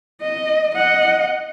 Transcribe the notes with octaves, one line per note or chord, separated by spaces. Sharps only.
D#5
D#5 F#5